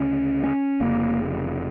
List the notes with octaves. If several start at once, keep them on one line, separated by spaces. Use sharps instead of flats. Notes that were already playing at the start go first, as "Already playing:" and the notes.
Already playing: D2 C#3 C#4
C#4
F1 F2 C#3 A#3